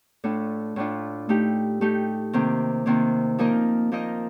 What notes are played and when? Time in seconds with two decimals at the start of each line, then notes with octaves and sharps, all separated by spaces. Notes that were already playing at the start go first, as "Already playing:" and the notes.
0.24 A2 A3 D4 F4
0.76 A2 A3 D4 F4
1.29 A3 D#4 G4
1.81 A3 D#4 G4
2.33 C3 D#3 A#3
2.86 C3 D#3 A#3
3.39 F3 A#3 D#4 A#4 D#5
3.92 F3 A#3 D#4 A#4 D#5